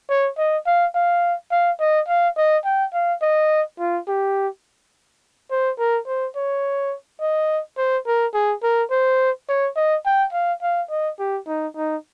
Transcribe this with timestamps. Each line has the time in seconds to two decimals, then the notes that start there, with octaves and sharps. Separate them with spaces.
0.10 C#5
0.38 D#5
0.67 F5
0.95 F5
1.52 F5
1.80 D#5
2.09 F5
2.38 D#5
2.65 G5
2.94 F5
3.22 D#5
3.80 F4
4.08 G4
5.51 C5
5.79 A#4
6.08 C5
6.36 C#5
7.21 D#5
7.78 C5
8.07 A#4
8.34 G#4
8.64 A#4
8.91 C5
9.49 C#5
9.76 D#5
10.06 G5
10.33 F5
10.62 F5
10.91 D#5
11.19 G4
11.48 D#4
11.77 D#4